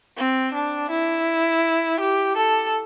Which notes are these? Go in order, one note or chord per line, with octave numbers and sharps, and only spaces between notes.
C4
D4
E4
G4
A4